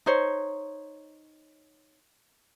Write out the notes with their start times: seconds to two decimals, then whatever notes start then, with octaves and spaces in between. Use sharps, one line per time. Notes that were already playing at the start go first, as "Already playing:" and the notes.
0.06 D#4 C5 C#5